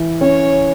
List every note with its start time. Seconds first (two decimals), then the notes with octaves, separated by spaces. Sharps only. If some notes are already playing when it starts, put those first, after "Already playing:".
Already playing: E3
0.21 C#4 C#5